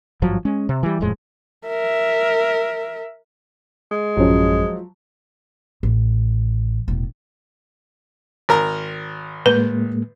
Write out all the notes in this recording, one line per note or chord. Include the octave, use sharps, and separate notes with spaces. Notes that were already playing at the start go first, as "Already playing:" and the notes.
G#1 G2 F3 F#3
G#3 C#4
C3
E3 G3
D#1 F2 A2 G#3
A#4 E5
G#3
A1 F#2 F3 F#3 C#4
A1
E1 A2
G#1 A#4 A#5
A2 G#3 A#3 B4